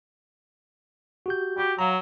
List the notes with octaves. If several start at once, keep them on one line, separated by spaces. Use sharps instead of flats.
F#4 G4 G6
F#4 G4
F#3 F5 A#5